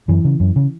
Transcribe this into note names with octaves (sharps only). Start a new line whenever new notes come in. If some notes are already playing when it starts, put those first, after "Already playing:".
F#2 E3
C#3
F#2
C#3